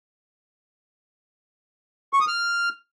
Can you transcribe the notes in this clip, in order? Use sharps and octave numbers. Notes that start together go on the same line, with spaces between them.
C#6
D#6
F6